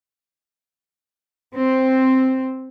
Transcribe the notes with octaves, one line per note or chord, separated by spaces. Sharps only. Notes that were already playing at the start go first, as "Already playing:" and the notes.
C4